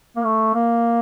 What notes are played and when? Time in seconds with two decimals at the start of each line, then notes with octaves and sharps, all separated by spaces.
0.16 A#3
0.25 A3
0.54 A#3